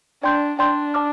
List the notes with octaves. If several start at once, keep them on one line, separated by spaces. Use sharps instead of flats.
D4 D5 G5 C6 G6
D4 D5 G5 C6 G6
D5 A5 D6 F6